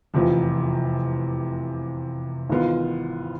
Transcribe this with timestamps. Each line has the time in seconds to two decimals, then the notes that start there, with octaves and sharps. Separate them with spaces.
0.14 F1 E2 C3 F3
2.49 G#1 G#2 E3 B3 F4